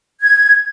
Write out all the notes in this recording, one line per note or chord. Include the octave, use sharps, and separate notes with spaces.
G#6